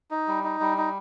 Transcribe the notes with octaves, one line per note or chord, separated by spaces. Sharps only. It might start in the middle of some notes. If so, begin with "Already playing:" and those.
D#4
G3
D#4
G3
D#4